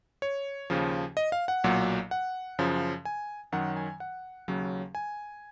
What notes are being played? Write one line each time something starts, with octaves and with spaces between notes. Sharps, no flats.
C#5
D#2 C#3 F3
D#5
F5
F#5
B1 A#2 F#3
F#5
F#2 C#3 F3
G#5
F#2 D#3 F#3 F#5
G#5
F#5
D#2 C#3 F#3
G#5